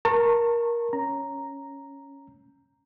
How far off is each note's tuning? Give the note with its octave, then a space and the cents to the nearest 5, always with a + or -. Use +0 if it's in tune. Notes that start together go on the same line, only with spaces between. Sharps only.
A#4 +15 A5 +35 C#6 -20
C#4 +0 A#5 +0